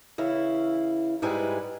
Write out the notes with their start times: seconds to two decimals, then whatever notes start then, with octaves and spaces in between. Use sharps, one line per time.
0.18 C#3 E3 E4
1.22 G#2 G3 G#3 E4 B4 G#5